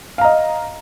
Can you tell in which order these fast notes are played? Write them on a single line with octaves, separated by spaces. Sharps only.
F5 A#5 D#5